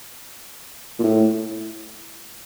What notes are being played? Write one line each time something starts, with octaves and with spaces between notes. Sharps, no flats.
A#2
A2